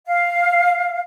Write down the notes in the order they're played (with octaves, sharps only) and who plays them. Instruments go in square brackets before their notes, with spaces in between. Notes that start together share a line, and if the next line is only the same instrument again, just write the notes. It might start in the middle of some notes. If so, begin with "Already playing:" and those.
[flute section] F5